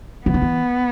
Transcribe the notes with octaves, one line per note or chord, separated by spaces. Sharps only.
E3 B3
D#3
E3